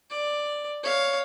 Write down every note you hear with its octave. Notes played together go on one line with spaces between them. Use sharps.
D5
C#5 F5